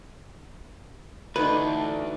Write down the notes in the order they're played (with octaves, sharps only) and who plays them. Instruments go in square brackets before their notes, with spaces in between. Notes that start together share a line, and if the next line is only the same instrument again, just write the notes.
[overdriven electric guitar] D2 [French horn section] E3 A3 D4 [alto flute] D#4 [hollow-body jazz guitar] B4